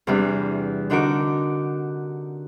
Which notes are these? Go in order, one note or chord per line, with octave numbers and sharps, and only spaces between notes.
E2 C3 E3 G3 D4
D3 D4 D#4 F#4 A#4 D6